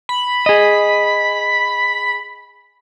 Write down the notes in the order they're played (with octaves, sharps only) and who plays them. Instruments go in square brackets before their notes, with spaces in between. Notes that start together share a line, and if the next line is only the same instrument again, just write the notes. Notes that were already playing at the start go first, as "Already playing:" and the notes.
[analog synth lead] B5
[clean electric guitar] G#4 D#5